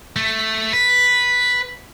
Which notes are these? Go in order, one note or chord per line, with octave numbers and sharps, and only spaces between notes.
A3
B4